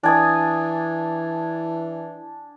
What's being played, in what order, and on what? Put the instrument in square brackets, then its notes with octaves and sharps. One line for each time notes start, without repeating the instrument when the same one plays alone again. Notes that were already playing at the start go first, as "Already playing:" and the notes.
[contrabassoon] E3 [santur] D4 G#5 D#6